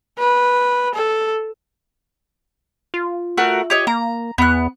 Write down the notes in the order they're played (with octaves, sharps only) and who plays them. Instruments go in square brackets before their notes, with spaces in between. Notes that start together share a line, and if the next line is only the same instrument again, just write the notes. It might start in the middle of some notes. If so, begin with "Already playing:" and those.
[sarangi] B4
A4
[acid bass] F4
[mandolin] A3 F#4 A#4
G4 C#5 D#5
[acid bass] A#3 [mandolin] A#5
[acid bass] E2 [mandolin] B3 F#6